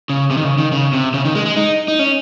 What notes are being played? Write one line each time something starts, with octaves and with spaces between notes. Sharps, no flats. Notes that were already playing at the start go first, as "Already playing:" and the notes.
C#3
C3
D#3
C#3
D#3
C#3
C3
C#3
D#3
G#3
G#3
D#4
D#4
C#4